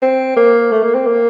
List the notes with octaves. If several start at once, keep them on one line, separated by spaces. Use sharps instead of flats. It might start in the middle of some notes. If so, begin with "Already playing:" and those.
C4
A#3
A3
A#3
C4
A#3